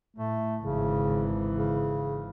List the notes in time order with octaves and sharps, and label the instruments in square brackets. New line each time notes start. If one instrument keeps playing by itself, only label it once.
[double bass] A2 [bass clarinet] A3
[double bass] G#1 E3 [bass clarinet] C#3
[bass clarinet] C#3